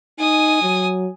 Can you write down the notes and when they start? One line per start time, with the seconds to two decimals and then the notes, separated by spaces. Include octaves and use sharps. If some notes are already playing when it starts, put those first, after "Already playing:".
0.19 D#4 G#5 D#6
0.62 F#3